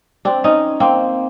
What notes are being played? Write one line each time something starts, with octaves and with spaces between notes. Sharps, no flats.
C4 D4
C#4 D#4
A#3 C4